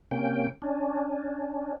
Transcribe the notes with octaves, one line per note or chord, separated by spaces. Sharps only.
C3 A#3 C#4 G5
C#4 D4